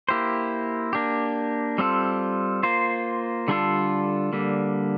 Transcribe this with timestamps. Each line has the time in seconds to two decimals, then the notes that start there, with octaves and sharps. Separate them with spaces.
0.09 A#3 E4 G4 C5
0.93 A#3 D4 G4
1.78 G3 C4 F4 A4
2.63 A#3 F4 C5
3.48 D3 G3 D4 F4 A4
4.33 D3 G3 A#3